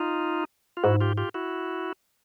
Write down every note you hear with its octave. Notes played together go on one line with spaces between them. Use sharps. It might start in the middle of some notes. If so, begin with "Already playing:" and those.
Already playing: D#4 F4
F4
G#2 E4 F#4
F4 G4
F4 G4
E4 F#4